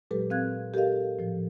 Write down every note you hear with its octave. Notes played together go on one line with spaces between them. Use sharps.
A#2 F#3 G#3 G4 A4 B4
C4 F5 F#6 G#6
G4 A4 A#4 D#5 F5
A2 F3